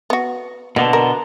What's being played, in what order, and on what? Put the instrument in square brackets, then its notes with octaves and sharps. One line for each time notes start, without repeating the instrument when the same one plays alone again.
[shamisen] B3 F#4
[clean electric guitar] B2 D3 [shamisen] A#3
[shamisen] A#4